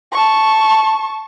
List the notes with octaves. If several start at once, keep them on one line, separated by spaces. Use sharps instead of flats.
A5 C#6